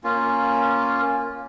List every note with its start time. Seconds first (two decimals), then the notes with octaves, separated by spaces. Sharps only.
0.04 A#3 C#4 F4